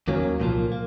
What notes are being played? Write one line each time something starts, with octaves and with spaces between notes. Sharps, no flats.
D#2 D#3 F#3 A#3 C#4
C2 A#2 F3 A#3
A#3